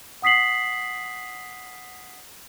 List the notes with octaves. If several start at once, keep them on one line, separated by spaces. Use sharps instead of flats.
F#5 D#6 B6 C7 F#7